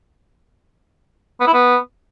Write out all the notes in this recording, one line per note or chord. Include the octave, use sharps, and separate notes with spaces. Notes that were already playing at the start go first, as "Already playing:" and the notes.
B3
E4
B3